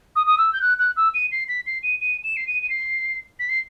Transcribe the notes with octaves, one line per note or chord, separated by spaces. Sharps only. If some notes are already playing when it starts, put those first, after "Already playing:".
D#6
D#6
E6
G6
F#6
F#6
E6
D#7
C7
B6
C7
D#7
D#7
E7
C7
D#7
D#7
C7
B6
C7